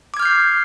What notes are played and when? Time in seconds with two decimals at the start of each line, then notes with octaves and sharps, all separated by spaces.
0.14 D6
0.17 G#6
0.20 F6
0.22 G6
0.25 C7